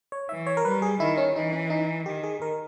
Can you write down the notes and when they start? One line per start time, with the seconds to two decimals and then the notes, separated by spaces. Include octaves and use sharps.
0.12 C#5
0.29 E3 E5
0.47 C#5
0.57 A#4
0.65 G3 B4
0.82 G#4
1.00 D#3 E4
1.18 C#4
1.35 E3 D#4
1.52 C#4
1.70 D#4
2.06 D#3 G4
2.24 G#4
2.42 A#4